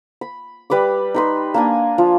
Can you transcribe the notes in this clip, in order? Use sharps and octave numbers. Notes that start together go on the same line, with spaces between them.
B5
G3 B4 B5 D6
D#4 B4 C6
A#3 D4 G#5
F3